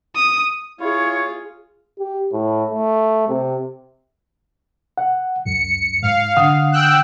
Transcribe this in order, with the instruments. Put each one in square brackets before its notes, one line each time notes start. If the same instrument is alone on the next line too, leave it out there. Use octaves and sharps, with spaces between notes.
[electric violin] D#6
[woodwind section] E4 C#5 [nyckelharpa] F4 G#4
[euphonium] G4
A2
A3
C3
[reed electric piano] F#5
[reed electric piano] C#2 F#2 [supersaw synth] C#7
[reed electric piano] G#2 [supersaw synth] F5
[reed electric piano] D3 F#5 D#6
[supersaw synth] G5 E6 F#6